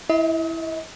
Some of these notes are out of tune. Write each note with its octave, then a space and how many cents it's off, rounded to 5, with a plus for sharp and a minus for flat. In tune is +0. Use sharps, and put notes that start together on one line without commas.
E4 +0 D#5 +45